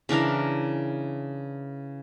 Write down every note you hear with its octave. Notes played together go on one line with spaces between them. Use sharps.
C#3 E3 D4 A#4